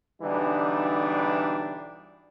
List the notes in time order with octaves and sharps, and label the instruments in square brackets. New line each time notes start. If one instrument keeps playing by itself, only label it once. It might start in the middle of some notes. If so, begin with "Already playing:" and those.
[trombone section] B1 D3 E3 G3 D4 D#4